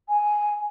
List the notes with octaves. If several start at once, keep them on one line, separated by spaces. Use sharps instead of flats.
G#5